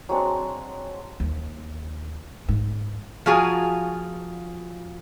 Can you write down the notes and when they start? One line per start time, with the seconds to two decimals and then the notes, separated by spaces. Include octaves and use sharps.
0.09 F#3 G#3 C4 D4
1.20 D#2
2.48 G#2
3.26 F3 F4 F#4 G#4 G#5 A#5